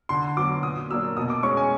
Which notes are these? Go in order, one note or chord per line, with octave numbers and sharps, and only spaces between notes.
D3 C6
F#3 B3 D6
A#2 D#6
F#3 A#3 D4 E6
B2 D#6
D6
G#3 C#4 C#6
G#5